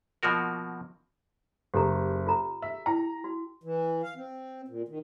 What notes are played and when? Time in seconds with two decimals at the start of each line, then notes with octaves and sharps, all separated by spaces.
0.23 B2 F3 A#3 F#4 A#4
1.74 F#1 G4 A4 A#5
2.26 F4 A4 A#5
2.62 E5
2.86 E4 G5 A#5
3.24 F#4
3.64 E3
4.03 F5
4.16 C4
4.68 A#2
4.88 D#3